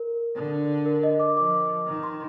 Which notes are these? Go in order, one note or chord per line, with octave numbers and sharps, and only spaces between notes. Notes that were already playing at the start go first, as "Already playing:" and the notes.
Already playing: A#4
D3
A#4
D#5
D6
F3 D6
D#3
C6